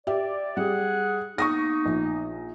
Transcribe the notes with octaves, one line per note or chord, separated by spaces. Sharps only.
G4 D5 E5
G3 G#4 F#5
A#3 B3 D#4 C#6 D#6 A#6
A#1